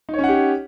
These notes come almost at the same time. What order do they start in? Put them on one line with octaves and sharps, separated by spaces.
D#4 C#5 C#4 F#5 G4